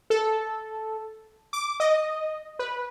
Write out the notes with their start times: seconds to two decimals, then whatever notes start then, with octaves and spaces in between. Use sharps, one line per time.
0.10 A4
1.53 D6
1.80 D#5
2.59 B4